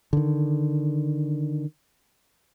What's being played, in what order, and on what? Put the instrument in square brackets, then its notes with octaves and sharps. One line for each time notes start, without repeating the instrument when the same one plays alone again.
[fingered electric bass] D3 D#3